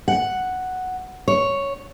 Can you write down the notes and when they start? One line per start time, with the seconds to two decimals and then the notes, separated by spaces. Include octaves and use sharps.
0.08 F#5
1.28 C#5